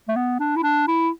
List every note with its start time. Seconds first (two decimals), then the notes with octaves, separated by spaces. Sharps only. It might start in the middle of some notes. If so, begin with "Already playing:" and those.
0.08 A3
0.16 B3
0.40 D4
0.56 E4
0.63 D4
0.88 E4